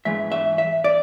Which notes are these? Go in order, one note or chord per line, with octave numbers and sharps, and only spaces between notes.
G#2 E3 G#3 E5
E5
E5
D5